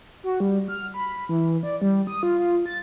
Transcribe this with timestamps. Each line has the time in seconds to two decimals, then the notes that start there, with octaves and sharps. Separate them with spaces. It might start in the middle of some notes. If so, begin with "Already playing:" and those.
0.23 F#4
0.40 G3
0.68 F6
0.94 B5
1.29 E3
1.63 D5
1.82 G3
2.07 D#6
2.23 F4
2.39 F4
2.66 A6